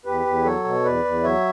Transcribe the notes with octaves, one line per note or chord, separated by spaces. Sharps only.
E2 G4 B4
E2
F#3 A4 C#5
B2
E2 B4 D5
E2
F#3 C#5 E5